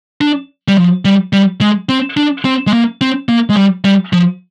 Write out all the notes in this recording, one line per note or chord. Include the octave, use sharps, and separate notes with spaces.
D4
G3
F3
G3
G3
G#3
C4
D4
C4
G#3
A#3
C4
A#3
G#3
G3
G3
F3